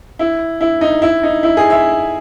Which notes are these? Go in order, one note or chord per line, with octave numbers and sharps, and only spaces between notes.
E4
E4
D#4
E4
D#4
E4
G#4
E5